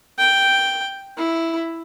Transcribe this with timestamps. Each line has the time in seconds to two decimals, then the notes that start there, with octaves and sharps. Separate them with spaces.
0.18 G5
1.17 E4